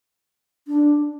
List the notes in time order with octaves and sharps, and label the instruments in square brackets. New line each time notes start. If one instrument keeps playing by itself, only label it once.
[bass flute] D4